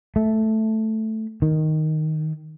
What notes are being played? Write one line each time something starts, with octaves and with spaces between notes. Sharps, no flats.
A3
D#3